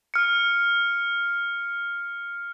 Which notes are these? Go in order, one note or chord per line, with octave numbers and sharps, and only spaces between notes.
F6 C#7